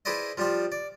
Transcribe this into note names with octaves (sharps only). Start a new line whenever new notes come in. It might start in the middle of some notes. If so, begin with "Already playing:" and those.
E4 G#4 B4 C5 D5 D#5
F3 G3 D4 G4 C5
D5